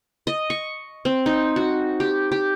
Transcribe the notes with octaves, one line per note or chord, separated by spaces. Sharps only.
D#5
C#6
C4
D#4
F#4
G4
G4